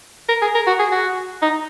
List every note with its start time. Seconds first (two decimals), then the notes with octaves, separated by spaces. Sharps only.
0.29 A#4
0.42 G#4
0.55 A#4
0.67 F#4
0.79 G#4
0.91 F#4
1.42 D#4